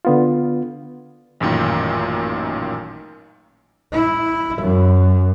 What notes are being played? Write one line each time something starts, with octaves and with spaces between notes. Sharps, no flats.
D3 B3 F4
A1 F#2 A#2 D#3 G5
E4
F#2